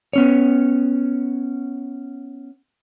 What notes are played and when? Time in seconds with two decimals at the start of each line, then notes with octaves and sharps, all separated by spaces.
0.13 B3 C#4 C#5